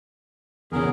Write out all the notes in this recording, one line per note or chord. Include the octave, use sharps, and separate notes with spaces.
E2 C#3 B3 G#4 A#4